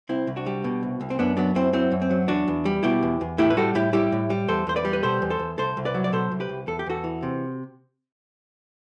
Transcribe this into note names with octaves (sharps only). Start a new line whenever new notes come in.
C2 C4 E4
C2
D4 F#4
G3
B2
C2
C2
C4
F#2 B3 D4
F#3 B3 D4
F#2 C4 E4
F#3 C4 E4
F#2
C4
F#3
E2 D4 F#4
E2
G3
B2 E4 G4
E2
E2
A2 E4 G4
B4
G3 F#4 A4
A2 E4 G4
G3 E4 G4
A2
G3
E2 A4 C5
E2 C5
B4 D5
G3
B4
B2 A4 C5
E2
A4 C5
E2
C2 A4 C5
C2
B4 D5
F#3
D5
B2 A4 C5
C2
G4 B4
C2
E2 A4
G4
E2 F#4 A4
E3
C3